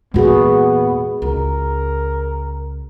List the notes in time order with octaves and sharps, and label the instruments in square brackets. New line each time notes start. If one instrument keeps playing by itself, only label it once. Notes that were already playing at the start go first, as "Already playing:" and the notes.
[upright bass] E2 A#2 [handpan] G#3 F#4 G#4 [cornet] B3
[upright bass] C#2 [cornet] A#4